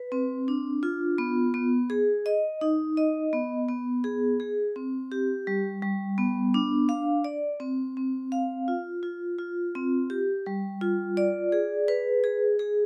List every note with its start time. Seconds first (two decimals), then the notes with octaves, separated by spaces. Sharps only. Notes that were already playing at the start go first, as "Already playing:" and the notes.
Already playing: B4
0.12 C4
0.48 D4
0.83 F4
1.18 B3
1.54 B3
1.90 G#4
2.26 D#5
2.61 D#4
2.97 D#5
3.33 B3
3.69 B3
4.04 G#4
4.40 G#4
4.76 C4
5.12 G4
5.47 G3
5.82 G3
6.18 B3
6.54 D4
6.89 F5
7.24 D5
7.60 C4
7.97 C4
8.32 F5
8.68 F4
9.03 F4
9.38 F4
9.75 C4
10.10 G4
10.46 G3
10.81 F4
11.17 D5
11.52 G#4
11.88 B4
12.24 G#4
12.59 G#4